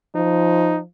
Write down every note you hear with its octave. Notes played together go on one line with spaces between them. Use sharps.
F3 D#4